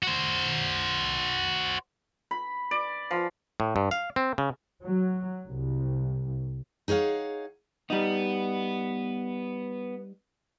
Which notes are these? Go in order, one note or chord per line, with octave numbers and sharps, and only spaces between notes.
F#4 C5
B5
D5
F3
A2
G2
F5
C4
C#3
F#3
C2
D#4 G#4 C#5 F5 F#5
G3 B3 D#4